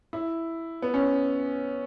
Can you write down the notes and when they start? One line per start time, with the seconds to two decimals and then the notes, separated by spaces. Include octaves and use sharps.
0.13 E4
0.82 B3
0.94 C#4